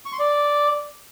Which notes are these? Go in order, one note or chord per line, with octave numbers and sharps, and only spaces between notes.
C#6
C6
D5